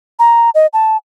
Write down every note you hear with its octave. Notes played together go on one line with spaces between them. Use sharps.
A#5
D#5
A5